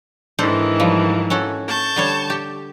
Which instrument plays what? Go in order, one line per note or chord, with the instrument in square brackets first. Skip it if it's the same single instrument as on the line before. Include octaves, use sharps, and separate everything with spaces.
[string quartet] G#2 D#3 E3 [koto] D4 A4 C5
[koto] F3 G3
C#4 F#4 A4
[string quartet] A5 C#6 G6
[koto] D3 G3 C#5
G4